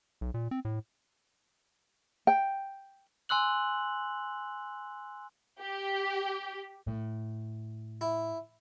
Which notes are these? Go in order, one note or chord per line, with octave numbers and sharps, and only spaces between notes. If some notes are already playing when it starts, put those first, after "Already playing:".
B1
A#2
C4
A2
G5
G#5 C6 E6 F#6 F#7
G4
A2
E4